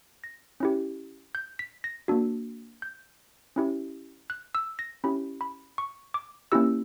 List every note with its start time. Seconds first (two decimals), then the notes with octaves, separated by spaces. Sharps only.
0.24 A#6
0.60 C#4 E4 G4
1.35 G6
1.59 B6
1.84 A#6
2.08 A#3 D4 F#4
2.82 G6
3.56 C#4 E4 G4
4.30 F#6
4.55 E6
4.79 A#6
5.04 C#4 E4 G4 B5
5.41 B5
5.78 C#6
6.14 D6
6.52 A#3 C#4 E4 G4 E6